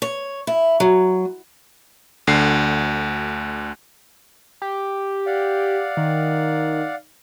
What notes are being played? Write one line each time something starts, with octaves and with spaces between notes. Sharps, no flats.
C#5
E4
F#3
D2 D3 C7
G4
D5 F5 F#5
D#3